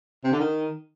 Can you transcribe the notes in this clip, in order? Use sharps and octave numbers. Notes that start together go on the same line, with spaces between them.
C3
D3
D#3